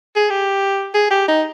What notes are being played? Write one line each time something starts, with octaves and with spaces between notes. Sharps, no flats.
G#4
G4
G#4
G4
D#4